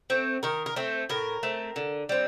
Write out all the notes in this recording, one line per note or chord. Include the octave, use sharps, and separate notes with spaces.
A3 C4
D#3 A#4
A#4
A3 C4 C5
A2 A#4
A3 C4
D3
G3 C4